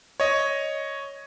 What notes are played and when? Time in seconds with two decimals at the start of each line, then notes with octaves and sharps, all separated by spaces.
0.20 C#5 D#5